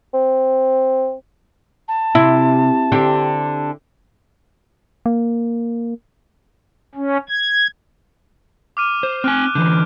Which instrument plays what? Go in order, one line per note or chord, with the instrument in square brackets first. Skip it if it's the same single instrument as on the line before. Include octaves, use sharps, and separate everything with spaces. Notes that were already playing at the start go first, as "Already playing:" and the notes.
[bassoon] C4
[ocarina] A5
[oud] C3 [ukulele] E4
[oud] D3 C4 G4
[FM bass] A#3
[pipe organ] C#4
G#6
[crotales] D6 F6 D#7
[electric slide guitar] C5
[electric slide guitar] C4 G#5 [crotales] F6 F#6 D7
[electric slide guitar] D3 E3 [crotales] G6 D#7